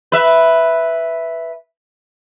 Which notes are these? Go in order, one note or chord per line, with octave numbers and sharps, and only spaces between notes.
B4 E5